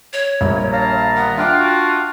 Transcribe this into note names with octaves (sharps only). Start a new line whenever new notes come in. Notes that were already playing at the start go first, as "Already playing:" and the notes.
C#5
A#1 G2 A#3
F5 A5 A#5
D#3 G3 B3 F#5
D4 F4 E5 F#5 G5 D6
F#4